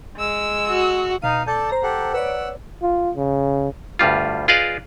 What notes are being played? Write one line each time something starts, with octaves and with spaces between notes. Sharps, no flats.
G#3 E6
F#4
B2 D#4 F5 D#7
A4 D5 A5 G6
C5 A#5
G4 A4 F#5
B4 C#5 D5 F#5 E6
F4
C#3
D2 G2 G3 F4
F4 G#4 B4 D5 D#5 F5